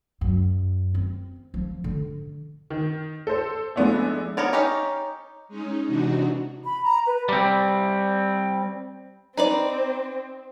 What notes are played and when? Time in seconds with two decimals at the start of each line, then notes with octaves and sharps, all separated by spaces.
0.21 F#2
0.94 C4
1.54 F3
1.84 D3
2.70 D#3
3.27 A4 C5
3.76 F3 G#3 A3 B3 D4 E4
4.37 B3 A#4 C#5 D5
4.53 C#4 D#4 G4
5.48 G#3 C#4 D#4
5.87 C3 E3 D4 D#4 F#4
6.64 B5
6.84 A#5
7.06 B4
7.29 G3 C4
9.37 C4 D#4 B4 D5